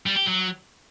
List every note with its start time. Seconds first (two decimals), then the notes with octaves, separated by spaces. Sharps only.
0.06 G3
0.16 G4
0.27 F#3